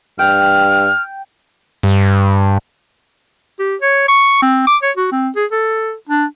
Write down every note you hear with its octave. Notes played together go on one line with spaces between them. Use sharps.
G2 G5 F6
G2
G4
C#5
C#6
C4
D6
C#5
F#4
C4
G#4
A4
D4